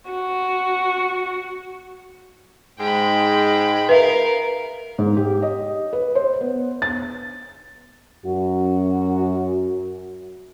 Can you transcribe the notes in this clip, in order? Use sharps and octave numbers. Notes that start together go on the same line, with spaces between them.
F#4
G#2 G#3 G5 B5
A#4 B4 E5 F5
G#2
G4
D#5
B4
C5
B3
A6
F#2 F#4